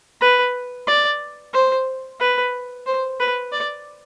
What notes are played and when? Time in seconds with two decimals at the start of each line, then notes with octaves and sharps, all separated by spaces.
0.21 B4
0.87 D5
1.53 C5
2.20 B4
2.86 C5
3.20 B4
3.52 D5